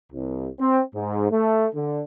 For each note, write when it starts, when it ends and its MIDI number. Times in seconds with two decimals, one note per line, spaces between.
0.11 0.48 36
0.58 0.80 60
0.93 1.27 44
1.30 1.66 57
1.74 2.01 50